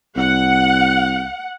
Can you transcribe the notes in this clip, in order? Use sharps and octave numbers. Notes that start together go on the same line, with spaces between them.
C2 F#5